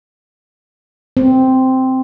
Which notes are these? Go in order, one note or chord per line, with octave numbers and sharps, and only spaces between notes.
C4